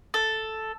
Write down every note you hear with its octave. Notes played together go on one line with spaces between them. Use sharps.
A4